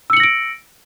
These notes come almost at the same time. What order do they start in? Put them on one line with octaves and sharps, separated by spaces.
E6 C#7 F#7 A#6 D7